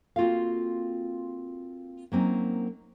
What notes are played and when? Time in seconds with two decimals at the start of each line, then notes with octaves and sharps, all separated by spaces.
0.16 A#3 C4 F4 F#4 A4 F5
2.12 F#3 A#3 C4 C#4 D#4